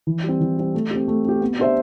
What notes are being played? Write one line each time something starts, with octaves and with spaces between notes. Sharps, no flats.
E3
G3 C4
E3
G3 C4
A3
C4 G4
A3
C4 G4
B3
D4 G4 C5 E5